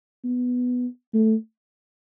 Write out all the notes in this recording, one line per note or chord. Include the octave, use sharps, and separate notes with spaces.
B3
A3